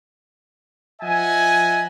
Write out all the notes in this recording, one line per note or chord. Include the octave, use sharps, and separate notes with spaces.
F3 D#5 E5 F#5 G#5